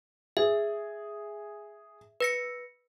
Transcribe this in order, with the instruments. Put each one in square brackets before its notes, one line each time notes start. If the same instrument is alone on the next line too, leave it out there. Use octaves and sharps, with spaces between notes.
[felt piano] G#4 [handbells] E5
[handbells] B4 A#6 C#7